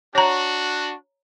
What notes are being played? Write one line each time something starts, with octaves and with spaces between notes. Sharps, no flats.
D4 F#4 C#5 A#5